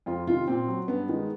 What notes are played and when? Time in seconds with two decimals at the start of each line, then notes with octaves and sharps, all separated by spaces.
0.06 F2 F4
0.27 C3 D#3 F4
0.48 A#2 C4
0.68 F#3
0.88 G2 B3
1.09 D#3 G#3